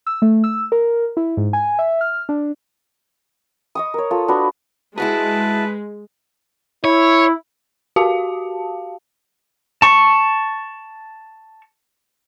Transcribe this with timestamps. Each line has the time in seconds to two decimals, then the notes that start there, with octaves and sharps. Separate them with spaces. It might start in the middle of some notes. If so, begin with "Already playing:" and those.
0.07 E6
0.22 A3
0.44 E6
0.72 A#4
1.17 E4
1.37 G#2
1.53 G#5
1.79 E5
2.01 F6
2.29 D4
3.75 D#5 C#6 D#6
3.94 A#4 C#5
4.11 F4 A4
4.28 D4 F#4 B4
4.98 G#3 E4 F#4 G#4 B4 A5
6.84 E4 C#5
7.96 F#4 G4 F5 A5
9.82 A5 C#6